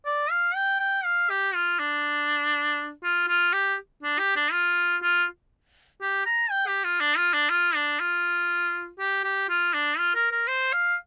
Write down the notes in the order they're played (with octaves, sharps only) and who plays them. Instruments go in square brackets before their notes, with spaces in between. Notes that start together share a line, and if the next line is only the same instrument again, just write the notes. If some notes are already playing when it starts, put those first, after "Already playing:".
[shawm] D5
F5
G5
G5
F5
G4
F4
D4
F4
F4
G4
D4
G4
D4
F4
F4
G4
A#5
G5
G4
F4
D4
F4
D4
F4
D4
F4
G4
G4
F4
D4
F4
A#4
A#4
C5
F5